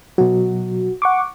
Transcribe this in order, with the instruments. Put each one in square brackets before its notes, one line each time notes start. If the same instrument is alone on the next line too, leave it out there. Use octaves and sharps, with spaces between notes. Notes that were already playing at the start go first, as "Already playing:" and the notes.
[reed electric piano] B2 F#3 [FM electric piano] F#4
[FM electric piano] F#5 C#6 D6